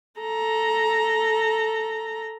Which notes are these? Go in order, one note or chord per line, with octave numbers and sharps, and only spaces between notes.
A4 A#5